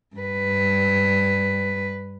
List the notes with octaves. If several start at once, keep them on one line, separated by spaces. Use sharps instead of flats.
G2 B4